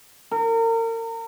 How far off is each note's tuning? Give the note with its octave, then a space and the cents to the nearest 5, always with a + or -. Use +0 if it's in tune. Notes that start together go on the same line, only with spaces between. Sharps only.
A#4 -35